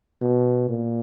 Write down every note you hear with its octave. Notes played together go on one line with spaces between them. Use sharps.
B2
A#2